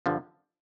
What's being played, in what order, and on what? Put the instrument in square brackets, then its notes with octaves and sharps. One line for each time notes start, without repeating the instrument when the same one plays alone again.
[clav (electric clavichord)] G2 D3 F3